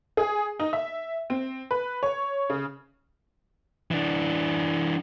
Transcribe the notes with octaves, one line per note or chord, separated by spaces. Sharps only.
G#4
D#4
E5
C4
B4
C#5
C#3
E3 D4